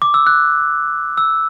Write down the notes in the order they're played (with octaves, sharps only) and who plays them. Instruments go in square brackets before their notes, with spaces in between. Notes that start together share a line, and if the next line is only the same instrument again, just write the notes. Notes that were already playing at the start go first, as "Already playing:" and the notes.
[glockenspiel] D6
E6
F#6
E6